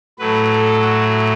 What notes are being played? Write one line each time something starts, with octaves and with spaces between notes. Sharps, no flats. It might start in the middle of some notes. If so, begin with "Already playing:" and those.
A2 F#3 A3 B4
A4
F#4